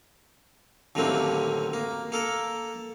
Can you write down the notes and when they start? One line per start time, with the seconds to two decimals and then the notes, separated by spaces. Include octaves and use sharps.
0.95 D#2 A2 D3 F#3 A#3 C4
1.73 A#3
2.12 A#3 A4 A#4